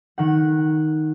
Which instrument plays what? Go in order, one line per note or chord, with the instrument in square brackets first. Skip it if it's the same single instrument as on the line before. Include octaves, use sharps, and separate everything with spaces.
[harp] D#3 F#5